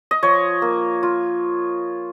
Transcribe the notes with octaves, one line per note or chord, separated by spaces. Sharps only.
D#5
F3 C#5
A#3
F4